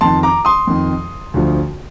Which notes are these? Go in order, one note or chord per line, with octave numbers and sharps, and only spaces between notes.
F2 D#3 A5 C6
A#5 D6
C6 D#6
F2 D#3
D2 D3 F3